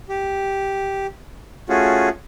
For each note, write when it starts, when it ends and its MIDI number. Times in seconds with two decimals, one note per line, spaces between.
0.09 1.07 67
1.69 2.09 57
1.69 2.09 61
1.69 2.09 65
1.69 2.09 66
1.69 2.09 68